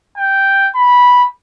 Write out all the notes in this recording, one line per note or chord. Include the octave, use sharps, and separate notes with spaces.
G5
B5